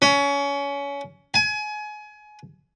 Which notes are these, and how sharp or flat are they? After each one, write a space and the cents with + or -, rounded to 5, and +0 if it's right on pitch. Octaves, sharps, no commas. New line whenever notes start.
C#4 +25
G#5 +25